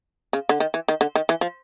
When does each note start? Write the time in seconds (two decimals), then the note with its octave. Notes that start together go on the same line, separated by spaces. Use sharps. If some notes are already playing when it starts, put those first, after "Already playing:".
0.33 C#3
0.49 D3
0.60 D#3
0.74 E3
0.88 D#3
1.01 D3
1.16 D#3
1.29 E3
1.41 F3